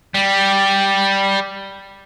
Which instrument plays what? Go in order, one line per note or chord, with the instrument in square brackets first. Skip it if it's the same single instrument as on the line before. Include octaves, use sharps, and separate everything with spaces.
[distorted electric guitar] G3